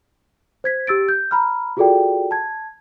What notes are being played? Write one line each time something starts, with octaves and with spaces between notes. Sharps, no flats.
C5 G#6 B6
G4 E6 A6 D7
G6
A#5 B5 F6
F4 F#4 G#4 A4 D5 G5
A5 G#6